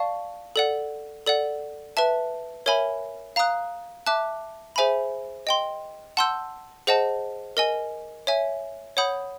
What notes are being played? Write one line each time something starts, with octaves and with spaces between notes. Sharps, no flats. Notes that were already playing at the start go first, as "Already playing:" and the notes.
Already playing: D5 F5 A5 C#6
A4 D5 F#5
A4 D5 F#5
B4 E5 A5
A#4 C#5 E5 G#5 B5
F5 A#5 D#6 F#6
E5 A5 D6 F#6
G#4 C5 E5 G#5 B5
D#5 G5 C6
F#5 A5 C6 E6 G6
G#4 C5 D#5 F#5 A5
A#4 D#5 G#5
C#5 E5 G#5
C#5 F#5 B5 D#6 G6